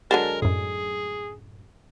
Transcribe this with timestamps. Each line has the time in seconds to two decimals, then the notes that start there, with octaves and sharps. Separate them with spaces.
0.11 D3 F#3 G#3 A#4 A5
0.42 F#2 A2 G#4